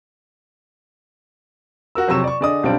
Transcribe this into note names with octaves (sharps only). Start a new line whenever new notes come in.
F#4 A#4 E6
F2 C3 F#3 C#6 E6 E7
D5 C#6
D3 G#4 D5 D#5 D#6
B1 G3 C4 D4 D7